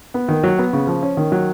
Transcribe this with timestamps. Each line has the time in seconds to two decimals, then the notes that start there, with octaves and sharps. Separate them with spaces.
0.14 B3
0.28 D#3
0.43 F#3
0.58 B3
0.73 C#3
0.87 F3
1.03 C#4
1.17 D#3
1.32 F#3